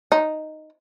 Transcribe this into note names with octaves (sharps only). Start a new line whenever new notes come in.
D#4